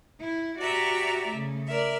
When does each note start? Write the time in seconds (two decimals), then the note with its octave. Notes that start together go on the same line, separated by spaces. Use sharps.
0.20 E4
0.58 F#4 G4 D5 E5 A#5
1.28 C#3 A3
1.67 A#4 D5 E5